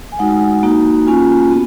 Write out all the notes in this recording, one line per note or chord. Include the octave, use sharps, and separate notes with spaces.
G#5
G#3 D#4 F#4 F#5
A#3 D#4 F#4
A#3 C#4 F4 G#5
B3 F#4